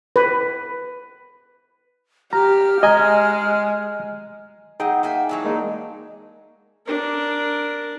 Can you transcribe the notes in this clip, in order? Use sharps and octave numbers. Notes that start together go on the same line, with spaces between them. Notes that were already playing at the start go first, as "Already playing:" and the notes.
B4
G4 A#5 F6
G#3 D#5 G#5 A#5
B2 F#3 D#4 G#4 D#5 G5
A#3 E5 G#5
E3 F#3 D4
G#3 A#3 D#4
D4 A#4